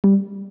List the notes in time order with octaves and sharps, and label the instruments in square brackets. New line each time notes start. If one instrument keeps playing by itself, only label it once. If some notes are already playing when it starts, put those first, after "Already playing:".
[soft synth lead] G3